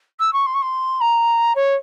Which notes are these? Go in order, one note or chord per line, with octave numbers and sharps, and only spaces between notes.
E6
C#6
C6
C#6
C6
A#5
C#5